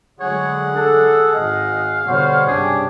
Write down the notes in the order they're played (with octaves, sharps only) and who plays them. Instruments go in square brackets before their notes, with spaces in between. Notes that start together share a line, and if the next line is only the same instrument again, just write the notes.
[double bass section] D3 F#3 G#3 [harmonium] G#4 F#5 [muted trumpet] C#5
[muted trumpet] D4 [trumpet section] A4
[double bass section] G#1 [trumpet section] D#5 [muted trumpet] F5
[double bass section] B2 D3 [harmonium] G3 [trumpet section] C5 C#5 F#5
[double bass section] B1 G2 C3 [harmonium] C#4 D4 G4 [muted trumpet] G#4